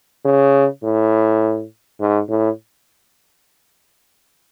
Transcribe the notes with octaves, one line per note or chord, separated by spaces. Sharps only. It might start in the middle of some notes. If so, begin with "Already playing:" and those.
C#3
A2
G#2
A2